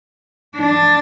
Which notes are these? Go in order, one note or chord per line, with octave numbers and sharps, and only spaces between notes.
D4